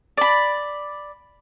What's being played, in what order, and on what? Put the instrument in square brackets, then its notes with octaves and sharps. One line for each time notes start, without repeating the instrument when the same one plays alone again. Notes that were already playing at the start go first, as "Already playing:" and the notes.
[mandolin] D5 B5